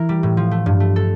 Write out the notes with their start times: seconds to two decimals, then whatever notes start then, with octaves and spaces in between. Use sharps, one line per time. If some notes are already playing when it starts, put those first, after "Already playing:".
Already playing: E3 E4 A#4
0.09 G3
0.23 A2
0.37 F3
0.51 A3
0.66 G2
0.80 A3
0.96 A4